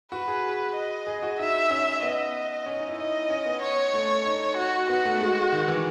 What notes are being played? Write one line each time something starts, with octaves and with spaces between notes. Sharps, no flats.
F#4 B4
G#4
D#5
G#4
F#4
D#4 E5
C#4
B3 D#5
C#4
D#4
E4
D#4 D#5
C#4
B3
C#5
A3
D#4
F#4
B3 F#4
A3
G#3
D#3
E3